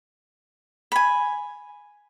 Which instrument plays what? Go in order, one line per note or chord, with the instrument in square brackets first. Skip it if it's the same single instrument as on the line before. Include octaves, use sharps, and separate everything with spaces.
[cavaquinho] G#5 B5